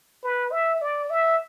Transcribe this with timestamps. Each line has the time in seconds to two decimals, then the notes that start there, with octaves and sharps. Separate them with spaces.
0.23 B4
0.52 E5
0.82 D5
1.10 E5